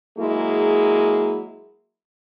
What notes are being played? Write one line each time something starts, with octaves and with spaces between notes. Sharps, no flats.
F#3 G#3 A#3 E4 G#4